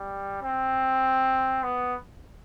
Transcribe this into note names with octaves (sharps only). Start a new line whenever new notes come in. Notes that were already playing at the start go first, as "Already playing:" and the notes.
Already playing: G3
C4
B3